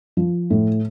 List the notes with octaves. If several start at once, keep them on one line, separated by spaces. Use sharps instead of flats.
F3
A2